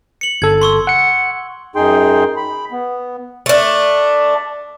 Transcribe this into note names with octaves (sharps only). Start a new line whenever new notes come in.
C#7 F#7
G1 A4 G#6
C6 C#6 E6
F#5 C#7
F#2 D#4 G#4 G5 C6
B5
B3
A3 D4